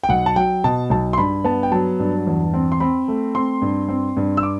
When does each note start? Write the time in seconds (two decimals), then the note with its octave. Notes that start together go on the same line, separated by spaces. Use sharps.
0.04 G5
0.09 B1 F#5
0.26 A5
0.36 F#3 G5
0.64 B2 A5
0.90 B1 A5
1.13 C6
1.18 G2 B5
1.44 B3 A5
1.63 G5
1.72 F#3 A5
1.99 G2
2.27 E2
2.54 C4
2.72 C6
2.80 C4 B5
3.08 A3
3.35 C4 C6
3.62 G2
3.89 C4
4.17 G2
4.37 E6
4.43 D6